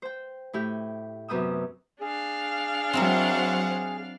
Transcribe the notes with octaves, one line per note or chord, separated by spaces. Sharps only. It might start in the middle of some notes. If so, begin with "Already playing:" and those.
C5 G5
A2 E4 G4 G5
F#2 C3 B3 G5 D#6 E6
D4 G#4 F5
F#3 C4 E4 A#4 C5 F#5